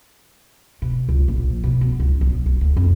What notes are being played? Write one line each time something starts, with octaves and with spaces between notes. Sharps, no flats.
B2
C#2
A#1
F3
B2
B3
C#2
B1
A#3
D2
F2